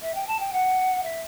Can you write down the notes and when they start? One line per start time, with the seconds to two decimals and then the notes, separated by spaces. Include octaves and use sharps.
0.01 E5
0.14 G5
0.27 A5
0.39 G5
0.52 F#5
1.02 E5